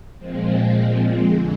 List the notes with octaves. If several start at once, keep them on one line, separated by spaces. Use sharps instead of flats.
A#2 F3 G#3 C4
F2 D3 G#3